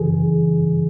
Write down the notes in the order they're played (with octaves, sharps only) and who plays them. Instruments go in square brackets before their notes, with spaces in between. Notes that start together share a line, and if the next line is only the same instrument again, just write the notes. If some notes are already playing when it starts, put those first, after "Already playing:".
Already playing: [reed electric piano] F#2 C#3 E3 G#4